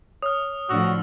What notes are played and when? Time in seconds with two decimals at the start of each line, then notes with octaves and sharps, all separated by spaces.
0.22 C#5 D#6 F6
0.69 A2 D3 F3 F#4 D#6 E6